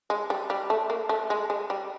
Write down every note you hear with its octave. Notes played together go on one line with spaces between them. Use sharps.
G#3
G3
G3
A3
A#3
A3
G#3
G#3
G3